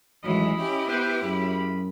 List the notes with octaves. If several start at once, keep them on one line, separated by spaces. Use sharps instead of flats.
A1 D#3 E3 F#3 G#3 D#5 B5
C#4 E4 G4
B3 B4 C5
F#2 C#3 G#3 B5